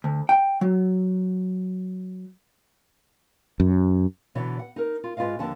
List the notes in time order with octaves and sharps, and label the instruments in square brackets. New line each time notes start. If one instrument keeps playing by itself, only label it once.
[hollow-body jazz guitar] D2
G5
F#3
[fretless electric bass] F#2
[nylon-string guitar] B2 D3 E3 C#5
F#5
D#4 A#4
F4
G#2 F4 B4 D#5 F5
D#2 D3 F3 A5